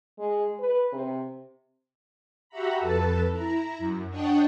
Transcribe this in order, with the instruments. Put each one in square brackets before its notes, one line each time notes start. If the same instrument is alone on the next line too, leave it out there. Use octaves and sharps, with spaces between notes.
[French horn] G#3
B4
C3
[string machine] F#4 G4 E5 F#5 A#5 B5
F2 A4 B4 A5
E4 A#5
F#2
D4 C#5 D#5 F#5 G5 A5